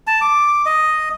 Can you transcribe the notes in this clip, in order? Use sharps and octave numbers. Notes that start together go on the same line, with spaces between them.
A5
D6
D#5